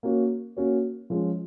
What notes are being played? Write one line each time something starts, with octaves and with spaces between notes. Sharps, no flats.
A#3 C#4 F#4 C#5
A#3 C#4 F#4 C#5
F3 G#3 C#4